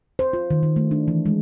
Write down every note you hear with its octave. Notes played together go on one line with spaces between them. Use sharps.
C5
F4
D#3
D#3
A3
D4
E3
G#3